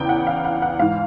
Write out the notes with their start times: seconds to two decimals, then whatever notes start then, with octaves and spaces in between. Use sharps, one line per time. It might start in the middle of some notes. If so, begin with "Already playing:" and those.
Already playing: E2 C#3 E3 G5
0.09 F#5
0.27 F5
0.45 F#5
0.62 F#5
0.79 G#2 E3 F5